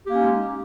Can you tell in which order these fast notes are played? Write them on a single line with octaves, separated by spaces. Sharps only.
G4 A#3 C#4 D#4 G#3